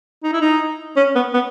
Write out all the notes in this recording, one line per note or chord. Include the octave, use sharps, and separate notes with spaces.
D#4
E4
D#4
C#4
B3
B3